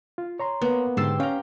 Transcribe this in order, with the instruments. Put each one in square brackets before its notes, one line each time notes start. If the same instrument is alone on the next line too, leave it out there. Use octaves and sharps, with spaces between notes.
[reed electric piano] F4
C#5 A#5 C6
[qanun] A#3 B3
[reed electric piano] G#2 D3 E6 [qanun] G4 A5 C6
[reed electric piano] C#4 F5 [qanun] G5 A#5